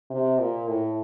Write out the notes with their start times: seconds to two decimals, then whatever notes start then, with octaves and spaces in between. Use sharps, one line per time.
0.10 C3
0.39 A#2
0.68 A2